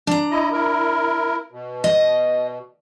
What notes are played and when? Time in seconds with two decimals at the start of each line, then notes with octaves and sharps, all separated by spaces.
0.07 D4 A#5
0.31 E4 D#5
0.52 E4 A#4
1.51 B2
1.84 D#5